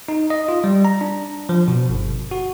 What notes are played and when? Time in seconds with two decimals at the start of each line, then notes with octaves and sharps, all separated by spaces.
0.08 D#4
0.30 D#5
0.49 F4
0.64 G3
0.85 A#5
1.01 D4
1.49 F3
1.68 B2
1.90 G1
2.31 F#4